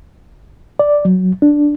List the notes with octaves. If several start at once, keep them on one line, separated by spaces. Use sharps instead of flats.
D5
F#3
D4